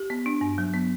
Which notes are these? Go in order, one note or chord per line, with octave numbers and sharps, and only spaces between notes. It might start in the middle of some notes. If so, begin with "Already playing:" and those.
Already playing: G4
B3
D4
G2
F#3
B3